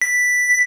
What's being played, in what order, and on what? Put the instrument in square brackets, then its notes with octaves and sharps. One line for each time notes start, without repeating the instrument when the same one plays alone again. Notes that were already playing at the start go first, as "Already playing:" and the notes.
[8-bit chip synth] B6